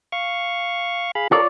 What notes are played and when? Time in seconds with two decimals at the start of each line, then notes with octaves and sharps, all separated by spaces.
0.12 F5 C#6
1.15 G#4 F5 B5
1.31 F4 A4 A#4 C#5 D5